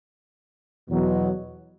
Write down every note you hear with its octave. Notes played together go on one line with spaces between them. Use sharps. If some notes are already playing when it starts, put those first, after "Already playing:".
E2 B2 F#3